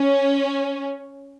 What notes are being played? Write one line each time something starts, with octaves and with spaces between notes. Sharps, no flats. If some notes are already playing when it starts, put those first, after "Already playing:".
Already playing: C#4